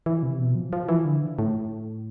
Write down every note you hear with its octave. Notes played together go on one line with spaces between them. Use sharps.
E3
C3
B2
F3
F3
E3
D3
A2